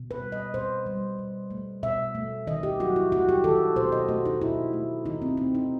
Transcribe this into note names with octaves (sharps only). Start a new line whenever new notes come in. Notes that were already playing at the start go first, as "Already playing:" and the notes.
Already playing: B2
B4
G3
D#5
B2 C5
G3
B2
A3
B2 E5
A3
D#3 D#5
G4
F#3 F#4
E4
A3 F#4
G4
D#3 A4
B2 C5
D#5
A3 F#4
D#4
B2 E4
A3
D#3 D#4
C4
A3 C4
D#4